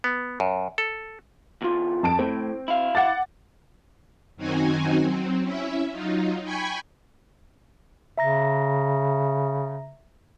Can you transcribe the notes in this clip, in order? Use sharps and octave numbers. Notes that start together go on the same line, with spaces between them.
B3
F#2
A4
E2 F4
F2 A5 D7
A2 C4
E4 F5
F#5 D6 A6
F#2 D#3 C4 D#4 F#4 G#5
F#3 C4
C#4 E4 E5
F#3 D#4 F4
G5 G#5 B5 C#6 G#6
C#3 E5 A#5 A#6